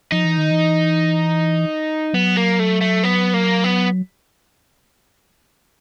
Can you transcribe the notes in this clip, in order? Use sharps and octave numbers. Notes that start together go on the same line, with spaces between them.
F3 D#4
E3
D#3
E3
F#3 B3
A#3
A3
A3
B3
A#3
B3